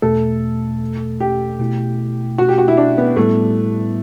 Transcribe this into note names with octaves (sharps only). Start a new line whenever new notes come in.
E2 B2 A3 A4
G4
B2 A3 E4
F#4
G4
F#4
E4
D4
B3
A2 G3 A3 B3 E4